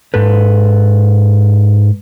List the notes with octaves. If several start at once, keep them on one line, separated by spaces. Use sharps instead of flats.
G#2 A4 B4